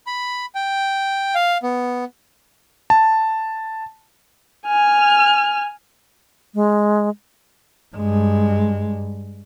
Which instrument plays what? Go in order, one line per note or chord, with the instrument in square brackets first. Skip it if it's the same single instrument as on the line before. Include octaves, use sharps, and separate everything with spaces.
[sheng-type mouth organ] B5
G5
F5
B3
[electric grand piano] A5
[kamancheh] G#5 F6
[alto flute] G#3
[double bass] G2 G#3